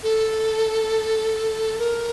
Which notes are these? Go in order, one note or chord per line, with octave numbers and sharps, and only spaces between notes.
A4
A#4